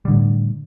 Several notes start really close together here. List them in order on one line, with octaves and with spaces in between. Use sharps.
G3 D3 A2